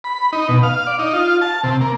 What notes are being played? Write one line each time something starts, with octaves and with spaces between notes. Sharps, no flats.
B5
D#4
B2
F5
D5
D#4
F4
A5
C3
A#3